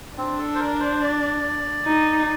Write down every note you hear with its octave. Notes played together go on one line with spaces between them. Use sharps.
C4 D4
A4
C5
A#4
C5
D5
D#4